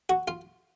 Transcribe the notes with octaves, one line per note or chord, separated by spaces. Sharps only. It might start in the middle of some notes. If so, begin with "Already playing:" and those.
F#4
F4